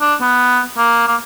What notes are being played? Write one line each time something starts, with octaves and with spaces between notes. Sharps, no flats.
D4
B3
A#3
A#3